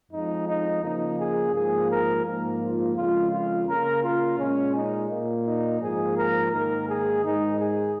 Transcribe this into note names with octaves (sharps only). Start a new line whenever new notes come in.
F2 F3 G#3 D#4
D#4
C#3 F3 A#3 D#4
G#4
G#2 F3 A#3 G#4
A#4
G#2 F3 A#3
F4
F2 C#3 G#3 F4
F4
C#3 A#3 A#4
F4
A#2 G#3 C#4
D#4
A#2 A#3
D#4
G#2 F3 A#3 G#4
A#4
G#2 D#3 A#3 A#4
G#4
G#2 D#3 G#3 D#4
G#4